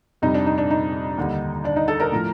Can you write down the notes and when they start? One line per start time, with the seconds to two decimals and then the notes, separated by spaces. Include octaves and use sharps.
0.22 F2 C3 G3 D#4
0.34 D4
0.46 D#4
0.58 D4
0.70 D#4
1.18 D#2 D3 G3
1.64 D4 D5
1.76 D#4 D#5
1.88 A4 A5
2.00 A#4 A#5
2.12 A2 F3